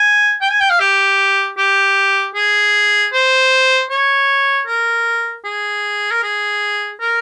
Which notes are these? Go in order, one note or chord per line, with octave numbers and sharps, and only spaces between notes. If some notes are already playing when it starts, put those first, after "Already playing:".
Already playing: G#5
G5
G#5
G5
F5
G4
G4
G#4
C5
C#5
A#4
G#4
A#4
G#4
A#4